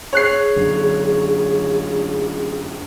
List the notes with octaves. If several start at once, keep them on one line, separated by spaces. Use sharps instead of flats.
G#4 C#5 F#6 C7
F#2 D3